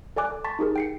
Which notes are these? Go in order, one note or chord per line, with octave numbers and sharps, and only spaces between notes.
A4 D5 G#5 D6 F#6
A5 C6 C#6 A6 B6
D#4 G4 G#4 A#4
G5 C7 C#7